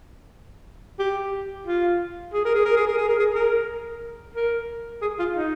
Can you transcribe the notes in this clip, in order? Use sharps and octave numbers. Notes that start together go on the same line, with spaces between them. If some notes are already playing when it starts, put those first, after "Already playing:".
G4
F4
G#4
A#4
G#4
A#4
G#4
A#4
G#4
A#4
G#4
A#4
A#4
G#4
F4
D#4